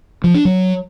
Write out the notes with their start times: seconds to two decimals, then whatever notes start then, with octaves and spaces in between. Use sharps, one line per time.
0.24 F3
0.34 D4
0.45 F#3